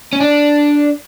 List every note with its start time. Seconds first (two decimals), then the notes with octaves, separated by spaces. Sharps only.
0.13 C#4
0.21 D4